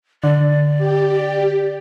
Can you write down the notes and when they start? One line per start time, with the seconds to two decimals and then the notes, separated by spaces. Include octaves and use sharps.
0.24 D3 D5
0.78 G4